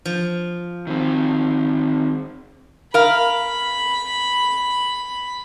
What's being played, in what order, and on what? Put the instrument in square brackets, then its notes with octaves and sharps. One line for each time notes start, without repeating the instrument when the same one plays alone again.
[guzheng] F3
[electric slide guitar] D#3 C4
[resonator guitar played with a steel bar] A#4 F5 [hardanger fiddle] B5